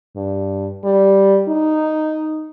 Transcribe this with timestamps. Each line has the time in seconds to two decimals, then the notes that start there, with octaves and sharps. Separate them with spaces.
0.16 G2
0.84 G3
1.49 D#4